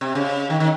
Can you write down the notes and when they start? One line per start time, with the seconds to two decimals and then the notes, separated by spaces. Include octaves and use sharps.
0.01 C3
0.15 C#3
0.50 D#3
0.60 D#3